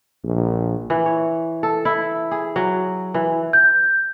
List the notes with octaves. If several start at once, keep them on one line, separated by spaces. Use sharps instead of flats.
A#1
E3
C#5
A4
E4
G#4
F#3
E3
G6